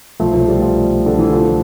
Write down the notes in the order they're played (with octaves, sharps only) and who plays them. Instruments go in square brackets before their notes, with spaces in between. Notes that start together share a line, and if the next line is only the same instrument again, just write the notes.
[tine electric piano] C2 B2 A3 [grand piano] F3
[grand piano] F3
G3
F3
D3
E3
F3